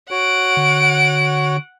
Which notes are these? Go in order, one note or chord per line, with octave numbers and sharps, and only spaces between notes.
F#4 C#5 F#5 D7
D3